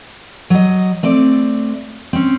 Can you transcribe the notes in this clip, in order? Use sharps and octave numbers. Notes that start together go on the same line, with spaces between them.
F#3 D#5
A3 C4 D5
C4 C#4